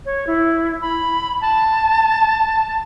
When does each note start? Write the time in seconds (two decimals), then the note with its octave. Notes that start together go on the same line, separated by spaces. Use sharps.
0.06 C#5
0.27 E4
0.81 B5
1.41 A5